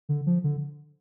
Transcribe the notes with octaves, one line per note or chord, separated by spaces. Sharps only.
D3
F3
D3